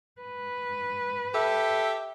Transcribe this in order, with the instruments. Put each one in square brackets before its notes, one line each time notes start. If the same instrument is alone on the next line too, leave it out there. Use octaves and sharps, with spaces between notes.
[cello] B4
[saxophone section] G4 E5 [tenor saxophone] A4